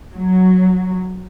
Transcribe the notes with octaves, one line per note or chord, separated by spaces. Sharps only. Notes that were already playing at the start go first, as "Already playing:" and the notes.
F#3